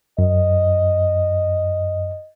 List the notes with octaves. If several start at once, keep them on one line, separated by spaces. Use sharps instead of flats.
F#2 D#5